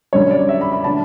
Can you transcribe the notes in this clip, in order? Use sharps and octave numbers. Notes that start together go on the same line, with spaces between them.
F#2 D3 G3 C#5
D5
E5
B5
B5
D3 A3 D4 A5